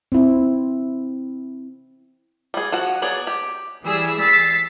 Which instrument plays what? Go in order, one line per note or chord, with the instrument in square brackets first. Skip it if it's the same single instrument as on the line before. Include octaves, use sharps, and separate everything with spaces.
[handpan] C4 E4
[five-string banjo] G3 G#4
F3 F#4 F#5
F#3 B3 G#4 D5
G4
[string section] E3 G3 G#4 E6
E6 A6 B6 C7